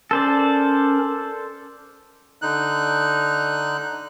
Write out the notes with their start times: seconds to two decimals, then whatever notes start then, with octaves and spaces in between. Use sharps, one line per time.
0.11 C#4 A4 A#4 C5 D5
2.42 D3 D#4 F#6